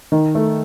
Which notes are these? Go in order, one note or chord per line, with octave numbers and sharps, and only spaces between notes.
D#3
A3